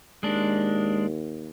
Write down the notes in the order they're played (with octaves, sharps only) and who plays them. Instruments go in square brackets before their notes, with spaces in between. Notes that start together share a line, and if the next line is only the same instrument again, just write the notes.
[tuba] D#2 [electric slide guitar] G#3 D4